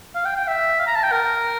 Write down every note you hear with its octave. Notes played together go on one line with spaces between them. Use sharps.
F5
G5
G5
E5
F5
A#5
A5
G5
A#4